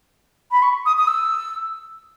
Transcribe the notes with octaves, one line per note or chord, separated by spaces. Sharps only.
B5
C#6
D#6
D#6
E6